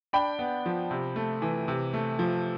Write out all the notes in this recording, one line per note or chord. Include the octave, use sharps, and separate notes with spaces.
D4 G5 B5
B3
F3
C3
A3
E3
C3
A3
F3